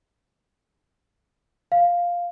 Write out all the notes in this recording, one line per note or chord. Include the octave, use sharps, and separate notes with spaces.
F5